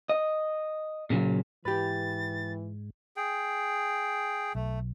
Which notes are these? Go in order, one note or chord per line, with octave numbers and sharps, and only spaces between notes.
D#5
A#2 C#3 F3 F#3
G#2 E3 G4 B4 A6
G#4 G5
B1 A3